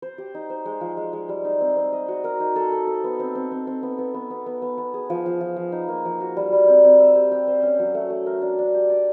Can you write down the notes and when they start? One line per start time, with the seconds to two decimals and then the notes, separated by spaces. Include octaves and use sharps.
0.02 C5
0.18 G4
0.35 D#4
0.50 C5
0.66 G#3
0.81 F3
0.97 G#3
1.13 G#3
1.29 G3
1.45 D#4
1.60 C4
1.77 C4
1.92 D#5
2.08 F#4
2.24 A#4
2.40 D#4
2.56 A4
2.72 A4
2.87 A4
3.04 B3
3.20 C4
3.35 C4
3.52 C4
3.67 C4
3.83 B3
3.99 B3
4.14 B3
4.30 B3
4.46 B3
4.62 B3
4.78 B3
4.94 G#4
5.10 F3
5.26 F3
5.41 F3
5.56 F3
5.72 D#4
5.88 A#3
6.05 F3
6.21 F#4
6.37 G3
6.53 G3
6.68 C4
6.84 C4
7.00 E5
7.15 G4
7.32 G4
7.47 C5
7.62 C#4
7.79 F#3
7.95 A3
8.10 A3
8.26 A#4
8.42 D4
8.59 D4
8.74 G4
8.90 D5